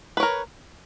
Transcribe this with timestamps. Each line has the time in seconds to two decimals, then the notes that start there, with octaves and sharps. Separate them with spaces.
0.17 B4
0.20 C#5
0.23 A#4